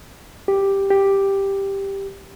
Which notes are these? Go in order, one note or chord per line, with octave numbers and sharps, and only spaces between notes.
G4
G4